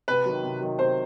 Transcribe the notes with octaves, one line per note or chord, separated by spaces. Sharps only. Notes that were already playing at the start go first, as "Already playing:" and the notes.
C3 B4
D#3 F#3
C3
D#3 F#3
C3 C5